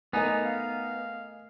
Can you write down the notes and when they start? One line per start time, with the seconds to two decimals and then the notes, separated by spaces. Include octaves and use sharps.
0.13 A3 B3 D#4 A#4 D#5 G#5
0.45 F5